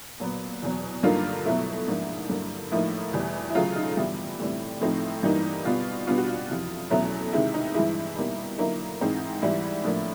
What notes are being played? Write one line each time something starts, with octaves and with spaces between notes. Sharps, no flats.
A#2 F#3 B3
E2 B2 F#3
G2 D3 F#3 A#3 D#4 F4
B2 F#3 A3 E4
G#2 F3 A#3 D4
G2 D3 F#3 A#3
A2 F3 A#3 D#4 E4
E2 B2 G3
E4
C#3 F#3 A3 F4
D#4
G2 E3 G3 B3 E4
A2 E3 G3 C4
A2 F3 A3 C4 D#4
G2 E3 G3 A#3 D#4
B2 G3 B3 F4
B2 G3 B3 D4 F4
F#4
F4
F2 C3 E3
E2 B2 F#3 A3 C#4 E4
C3 D#3 G#3 E4
D#4
G2 E3 G#3 E4
B2 G3 A#3 D#4
D3 F#3 A#3 D#4 E4
G#2 E3 G#3 C4 D#4
G#2 E3 G3 E4
A2 F3 A#3 D4